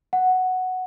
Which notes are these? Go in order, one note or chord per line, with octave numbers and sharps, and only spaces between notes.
F#5